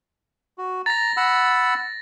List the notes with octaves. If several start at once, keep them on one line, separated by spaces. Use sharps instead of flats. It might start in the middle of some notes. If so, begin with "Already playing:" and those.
F#4
A#5 A6 A#6
F#5 B5 E6